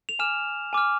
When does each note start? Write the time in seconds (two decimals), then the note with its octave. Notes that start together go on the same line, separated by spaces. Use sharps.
0.09 F7
0.19 G#5 D6 F6 E7
0.73 G#5 D6 F6